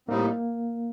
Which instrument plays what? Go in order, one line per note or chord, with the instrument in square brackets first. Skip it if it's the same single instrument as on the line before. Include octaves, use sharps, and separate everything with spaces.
[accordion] A2 G3 C4 D#4 [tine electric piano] A#3